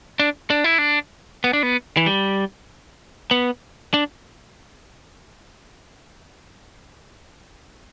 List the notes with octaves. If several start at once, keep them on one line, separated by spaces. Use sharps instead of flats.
D4
D4
E4
D4
B3
D4
B3
E3
G3
B3
D4